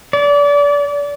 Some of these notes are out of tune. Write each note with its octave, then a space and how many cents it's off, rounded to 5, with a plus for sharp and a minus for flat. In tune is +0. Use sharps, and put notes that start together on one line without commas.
D5 -30